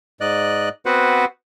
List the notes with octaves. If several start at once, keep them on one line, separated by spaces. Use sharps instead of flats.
G#2 D5 D#5 F#6
B3 C4 F#4 B4 C5 F#5